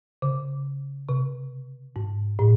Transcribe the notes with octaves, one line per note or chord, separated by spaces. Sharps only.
C#3
C3
G#2
A2